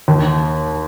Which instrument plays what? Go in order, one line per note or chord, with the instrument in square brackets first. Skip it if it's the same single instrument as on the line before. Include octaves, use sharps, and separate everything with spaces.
[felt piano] D#2